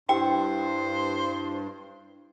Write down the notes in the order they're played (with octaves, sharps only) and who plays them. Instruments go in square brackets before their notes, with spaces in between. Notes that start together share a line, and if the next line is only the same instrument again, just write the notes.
[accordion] G2 [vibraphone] E4 [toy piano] G4 G5 [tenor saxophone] C5